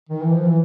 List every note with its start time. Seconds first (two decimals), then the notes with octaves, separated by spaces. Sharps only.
0.09 D#3
0.22 E3
0.33 F3
0.45 E3